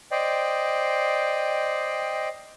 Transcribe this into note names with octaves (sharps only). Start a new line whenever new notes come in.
C5 D5 D#5 G5